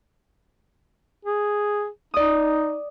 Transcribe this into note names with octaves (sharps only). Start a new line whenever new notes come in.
G#4
D#4 D5 D#6